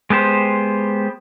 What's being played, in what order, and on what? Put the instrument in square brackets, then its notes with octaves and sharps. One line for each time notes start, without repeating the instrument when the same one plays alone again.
[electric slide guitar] G#3 B3 G4 C5